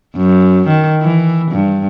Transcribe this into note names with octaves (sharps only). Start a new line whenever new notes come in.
F#2
D#3
E3
G2